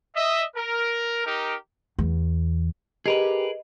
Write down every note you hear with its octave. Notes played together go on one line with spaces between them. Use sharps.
D#5 E5
A#4
D#4 G4 A#4
E2
G4 G#4 A#4 B4 D#5